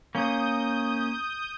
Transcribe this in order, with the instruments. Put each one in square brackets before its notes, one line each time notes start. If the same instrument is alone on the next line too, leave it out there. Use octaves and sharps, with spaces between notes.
[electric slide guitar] A#3 C#4 [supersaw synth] D#6 G6